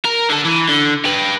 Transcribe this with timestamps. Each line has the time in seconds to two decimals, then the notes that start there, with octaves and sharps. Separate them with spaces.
0.05 A#4
0.30 D3 A4
0.45 E3
0.68 D3
1.05 G4 B4